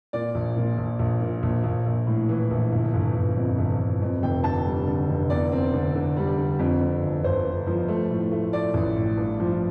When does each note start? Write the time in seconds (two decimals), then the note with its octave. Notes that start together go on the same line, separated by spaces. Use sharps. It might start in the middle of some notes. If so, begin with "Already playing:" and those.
0.13 A#2 D5
0.35 A#1
0.57 A#2
0.78 A#1
0.99 A#1
1.21 A#2
1.43 A#1
1.64 A#1
1.86 A#1
2.07 A2
2.29 E3
2.51 A#1
2.72 G1
2.94 G1
3.15 G1
3.37 F2
3.58 G1
3.80 G1
4.02 F2
4.23 F1 G5
4.44 D3 A5
4.66 G3
4.87 D3
5.09 F1
5.30 E2 D5
5.52 C4
5.74 D3
5.95 D3
6.17 G3
6.38 D3
6.59 F2
6.81 F2
7.02 G1
7.23 G1 C5
7.45 G1
7.67 F3
7.88 A3
8.10 A2
8.32 A3
8.53 A3 D5
8.74 A1
8.97 A2
9.17 G2
9.40 F3